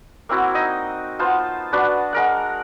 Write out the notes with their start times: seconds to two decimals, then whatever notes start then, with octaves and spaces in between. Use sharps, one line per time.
0.29 A#3 C4 E4 F#4
0.55 D#4 D#5
1.19 B3 F4 C5 A5
1.73 D4 F#4 B4
2.13 G#3 A#4 F#5